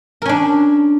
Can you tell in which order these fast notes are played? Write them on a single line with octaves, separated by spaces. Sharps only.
A#4 C#4 D4